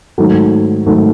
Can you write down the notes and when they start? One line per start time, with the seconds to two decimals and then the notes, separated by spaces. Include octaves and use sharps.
0.18 G#2 D#3 F#3 A3
0.86 G#2 D#3 F#3 A3